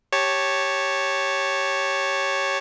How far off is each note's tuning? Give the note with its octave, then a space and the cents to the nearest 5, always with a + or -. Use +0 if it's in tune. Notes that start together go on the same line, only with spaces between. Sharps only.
G4 +0 C#5 -5 A5 +0